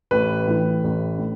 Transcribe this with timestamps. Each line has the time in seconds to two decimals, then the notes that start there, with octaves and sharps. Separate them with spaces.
0.11 A1 B4
0.47 A2 E3
0.84 A1
1.19 A2